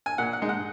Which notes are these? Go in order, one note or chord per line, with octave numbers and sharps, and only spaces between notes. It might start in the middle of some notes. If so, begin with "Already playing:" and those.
G#5
A#2 F#5
F#5
G#3 D#4
F#5